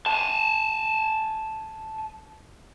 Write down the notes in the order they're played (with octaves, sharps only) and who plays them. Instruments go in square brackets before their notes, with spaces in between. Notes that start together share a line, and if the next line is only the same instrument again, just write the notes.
[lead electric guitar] G#5 A5